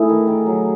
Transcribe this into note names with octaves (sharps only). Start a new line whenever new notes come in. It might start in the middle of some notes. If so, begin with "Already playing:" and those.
Already playing: A3 E4 G#4
D#3
D#3
F#3